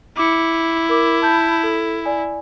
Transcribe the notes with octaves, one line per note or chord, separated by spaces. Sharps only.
E4 D6 C#7
A#4 D6
A5 B5 G6
A4
D5 G#5